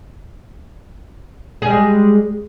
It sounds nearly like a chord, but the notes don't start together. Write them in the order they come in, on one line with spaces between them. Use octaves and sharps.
G#4 G3 G#3